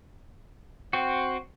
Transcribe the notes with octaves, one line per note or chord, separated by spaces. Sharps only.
C4 F#4